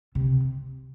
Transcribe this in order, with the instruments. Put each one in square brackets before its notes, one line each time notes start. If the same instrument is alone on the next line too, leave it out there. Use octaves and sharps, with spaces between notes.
[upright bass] C3